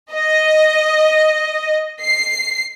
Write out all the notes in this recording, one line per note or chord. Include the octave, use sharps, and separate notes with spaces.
D#5
C7